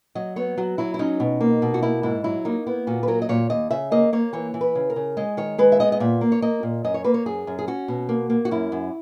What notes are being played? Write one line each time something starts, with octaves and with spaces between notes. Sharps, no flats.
F#3 D#5
B3 C#5
F#3 F#4
F#3 E4
E4
C#4 D#4
B2
A#3
B2
F#4
A#3 E4
G#2 E4
F#3 E4
A#3 D#4
B3 E4
A#2 F#4
B4
F#3 A#4
D#5
A#2 C#5
D#2 D#5
C#3 E5
A#3 D#5
A#3 C#5
E3 C#5
E3
B4
C#3
A#4
C#3
G#3 D#5
D#3 C#5
G#3 B4
E5
B3 D#5
D#5
A#2 E5
A#3
C#5
A#3 D#5
A#2
F#2 D#5
C#5
A#3 B4
C#5
F#2 G#4
F#2
G#4
C#4 F#4
B2
A#3
A#3
F#4
F#2 E4
F#2